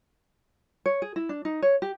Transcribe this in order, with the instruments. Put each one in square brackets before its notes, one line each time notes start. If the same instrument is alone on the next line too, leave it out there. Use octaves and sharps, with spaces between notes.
[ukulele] C#5
G#4
E4
D4
D#4
C#5
G4